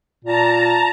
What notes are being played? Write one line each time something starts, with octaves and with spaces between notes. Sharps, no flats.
A#2 A5 A#5